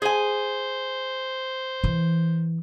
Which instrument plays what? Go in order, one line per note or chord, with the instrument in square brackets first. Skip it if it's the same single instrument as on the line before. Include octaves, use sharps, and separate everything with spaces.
[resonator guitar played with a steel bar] G#4 G#5 [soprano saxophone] C5
[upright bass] E3